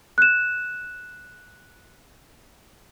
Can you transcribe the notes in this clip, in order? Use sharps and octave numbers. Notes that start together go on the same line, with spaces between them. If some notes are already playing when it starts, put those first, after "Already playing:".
F#6 E7